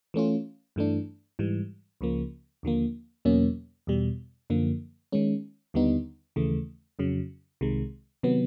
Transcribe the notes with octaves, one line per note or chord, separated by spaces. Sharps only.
E3 A3 C#4 F4
G2 E3 A3 D4
G#2 E3 G3
C#2 C#3 F3 A#3
D#2 D3 F3 A#3
E2 B2 F#3 A#3 C#4
E2 B2 G3
F#2 D3 F3 A#3
D#3 G#3 C#4
D#2 D3 G3 B3 D#4
D#2 C#3 E3 A3
F2 C#3 F#3
C2 C3 D#3 G#3
C3 D#3 F#3 B3